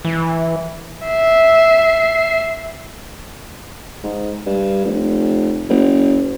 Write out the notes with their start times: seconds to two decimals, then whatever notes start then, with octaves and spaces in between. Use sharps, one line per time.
0.05 E3
1.07 E5 C7
4.04 G#2
4.46 G2
4.85 F1
5.69 F#1